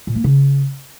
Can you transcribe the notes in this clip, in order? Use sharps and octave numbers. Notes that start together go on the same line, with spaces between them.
A#2
A#3
C#3